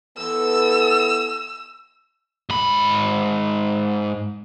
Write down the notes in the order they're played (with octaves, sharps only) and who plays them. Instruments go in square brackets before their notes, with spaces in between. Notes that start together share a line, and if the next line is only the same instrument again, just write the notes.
[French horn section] E3 B3 A4 [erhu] E6
[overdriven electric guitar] G#2 B5